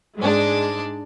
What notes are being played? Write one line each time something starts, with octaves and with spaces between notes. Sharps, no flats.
G#2 G#3 D4